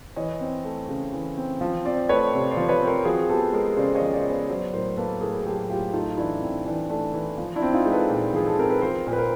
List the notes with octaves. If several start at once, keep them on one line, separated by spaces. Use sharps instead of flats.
E3 C#5 D#5
C4
A3
C#3
E3
C4
F3
C4 C5 D5
A3 B4 C#5
C3 C5 D5
C5 D5
F3
B4 C#5
C4
A#4 C5
F3 F#4 G#4
B3 G4 A4
G#3 A#4 C5
C#3 C5 D5
C#5 D#5
F3
C5 D5
B3
B4 C#5
F#3 C5 D5
A2 A#4 C5
A#3 A4 B4
A2 G#4 A#4
F#3 G4 A4
A2 F4 G4
A3 D#4 F4
E3 D4 E4
C4 D4
E3 D4
A3 D4
E3
F3
D4 E4
C4
D#4 F4
G#3
A4 B4
A#2
F3 G#4
A4
C4 A#4
B4
F3 A#4 C5
A#2
B4
A#4 C5